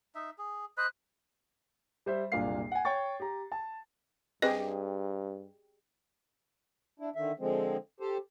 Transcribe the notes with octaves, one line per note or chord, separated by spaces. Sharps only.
D#4 E5
G#4
C5 D#5 B5 F#6
G3 C5 E5
F#1 C2 A#2 D4 F5 C7
F#5 G#5
C#5 G5 C#6 A6
G4 A#5
A5
G2 C4 G4 G#4 B4 D#5
D4 E4
D3 D#3 E5
D3 F3 G#3 C4
G4 A4 C5